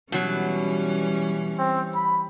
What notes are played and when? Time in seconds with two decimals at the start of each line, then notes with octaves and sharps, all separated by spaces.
0.12 B2 E3 F#3 G3 C#4
1.58 C4
1.95 B5